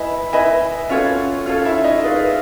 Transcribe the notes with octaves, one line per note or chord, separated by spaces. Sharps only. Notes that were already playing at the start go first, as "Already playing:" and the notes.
Already playing: E4 B4 D#5 E5 G#5 B5
E4 B4 D#5 E5 G#5 B5
C#4 F4 F#4 A4 C#5 F5
C#4 F4 F#4 A4 C#5 F5
E4 E5
D#4 D#5
G#4 B4 D5 F5